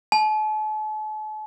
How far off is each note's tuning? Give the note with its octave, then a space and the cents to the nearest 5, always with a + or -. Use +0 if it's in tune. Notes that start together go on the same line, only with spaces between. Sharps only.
A5 -45